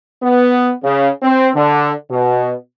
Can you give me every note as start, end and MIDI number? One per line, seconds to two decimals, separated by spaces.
0.22 0.71 59
0.83 1.08 49
1.23 1.49 60
1.55 1.91 50
2.10 2.53 47